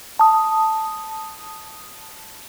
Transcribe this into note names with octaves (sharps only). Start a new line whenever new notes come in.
A5 D#6